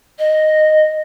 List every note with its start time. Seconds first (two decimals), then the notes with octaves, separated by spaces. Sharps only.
0.19 D#5